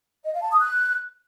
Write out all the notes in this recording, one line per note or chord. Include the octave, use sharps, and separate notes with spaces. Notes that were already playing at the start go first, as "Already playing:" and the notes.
D#5
F5
A5
D#6
F#6